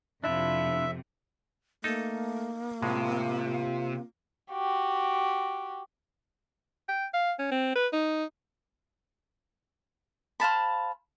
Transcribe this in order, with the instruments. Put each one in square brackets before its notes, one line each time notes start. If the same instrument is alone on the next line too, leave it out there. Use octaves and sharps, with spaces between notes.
[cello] F2 C3 [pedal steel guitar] D4 E4 F4 [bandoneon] E5
[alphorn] A3 [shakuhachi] A#3 [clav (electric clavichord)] D#4 A4
[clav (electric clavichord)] A2 G#3 [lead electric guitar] C3 [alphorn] F4
[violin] F#4 G4
[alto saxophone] G5
F5
C#4
C4
B4
D#4
[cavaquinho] C5 F5 A5 B5